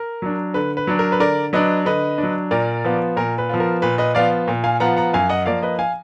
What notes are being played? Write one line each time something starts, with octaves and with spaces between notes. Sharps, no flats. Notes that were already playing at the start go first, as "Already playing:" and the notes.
Already playing: A#4
F#3 D4
D3 B4
B4
F#3 D4
A#4
B4
D3 A#4 D5
F#3 D4 B4 D#5
D3 B4 D#5
D4
F#3
A#2 A#4 D5
F3 B3 F4
A#2 A#4
B4
F3 B3 F4
A#4
A#2 B4
B4 D#5
F3 B3 F4 D5 F5
A#2
F5 G#5
F3 B3 F4 F#5 A#5
F#5 A#5
F#2 F5 G#5
D#5 F#5
F3 A#3 D5 F5
B4 D#5
F5 G#5